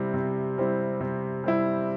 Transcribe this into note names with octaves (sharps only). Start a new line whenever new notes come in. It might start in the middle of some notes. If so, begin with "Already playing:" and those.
Already playing: C3 G3 C4 E4
C3
G3 C4 E4
C3
G3 C4 E4